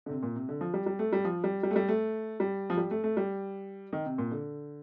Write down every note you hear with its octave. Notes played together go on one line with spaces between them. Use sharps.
D3
C3
A#2
C3
D3
F3
G3
G3
A3
G3
F3
G3
G3
A3
G3
A3
G3
F3
G3
A3
A3
G3
D#3
C3
A#2
D3